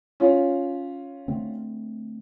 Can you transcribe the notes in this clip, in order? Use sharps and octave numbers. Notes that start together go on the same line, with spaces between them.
C#4 F4
D3 A3 C4